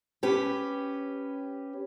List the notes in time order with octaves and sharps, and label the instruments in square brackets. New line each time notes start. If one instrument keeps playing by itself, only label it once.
[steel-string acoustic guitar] C#4 G4 B4